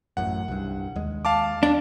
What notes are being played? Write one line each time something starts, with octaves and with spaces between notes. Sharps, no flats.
A1 F#2 A2 F#5
C2 G2
D#2 G#3
F5 A5 D6
D4